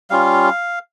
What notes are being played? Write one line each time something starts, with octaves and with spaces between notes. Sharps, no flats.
G3 C#4 F4 F5